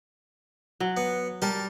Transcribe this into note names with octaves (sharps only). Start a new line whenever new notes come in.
F#3
B3
G3 A#4 G5 A5